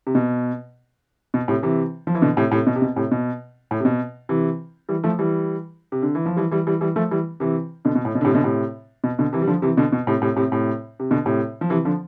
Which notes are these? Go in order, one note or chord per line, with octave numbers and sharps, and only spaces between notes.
C3
B2
B2
A2 C3
C3 E3
F3
E3
B2 D3
A2 C3
A2 C3
B2
C3
B2
A2 C3
B2
A2
C3
B2
C3 E3
E3 G3
F3 A3
E3 G3
C3
D3
E3
F3
E3 G3
E3 G3
E3 G3
E3 G3
F3 A3
E3 G3
C3 E3
B2 D3
B2
A2
B2
D3
A2 C3
B2 D3
A2 C3
B2
B2 D3
C3 E3
G3
D3 F3
C3 E3
B2 D3
B2
A2 C3
A2 C3
A2 C3
A2 C3
C3
B2 D3
A2 C3
F3
C3 E3
D3 F3